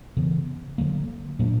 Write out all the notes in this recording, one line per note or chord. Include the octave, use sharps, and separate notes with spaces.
C#3 E3 B3
D3 F#3 A#3
A#2 F#3 A#3 D4